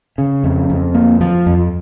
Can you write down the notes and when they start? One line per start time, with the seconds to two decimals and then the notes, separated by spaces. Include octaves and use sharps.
0.18 C#3
0.44 F2
0.70 F2
0.94 A#3
1.21 F3
1.46 F2